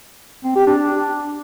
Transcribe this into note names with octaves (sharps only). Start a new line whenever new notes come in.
C4
G4
D4